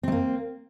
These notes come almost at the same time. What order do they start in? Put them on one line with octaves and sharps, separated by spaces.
C4 A3 A#3